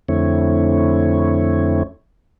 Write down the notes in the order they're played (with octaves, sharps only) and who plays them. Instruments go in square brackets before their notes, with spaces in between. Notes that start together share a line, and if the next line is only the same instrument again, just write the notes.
[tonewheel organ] F2 D3 A3 C4 E4 C#5